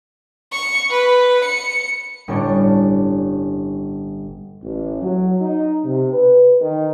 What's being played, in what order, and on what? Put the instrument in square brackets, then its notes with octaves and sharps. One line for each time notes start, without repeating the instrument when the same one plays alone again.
[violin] C#6
B4
C#7
[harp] G1 A2 C#4 D4
[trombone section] A1
F#3
D#4
C3
B4
D#3